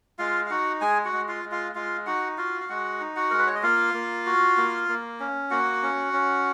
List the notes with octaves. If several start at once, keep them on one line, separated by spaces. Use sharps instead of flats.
G#3 F4 F5
F5
D#4 F#4 F#5
G#3 G#4 G#5
F#4 F#5
G#3
F4 F5
G#3
F4 F5
G#3 F4 F5
D#4 F#4 F#5
F4 F#4 F5
F5
G#3 F#4 F#5
D#4
F#4 F#5
G#3 A#4
B4
C#5
D#5
A#3 F4 F5
A#3
F#4
A#3
A#3
C#4
A#3 F#4 F#5
C#4
C#4